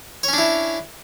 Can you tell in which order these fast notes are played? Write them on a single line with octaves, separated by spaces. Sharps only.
C#5 C#4 D4 E4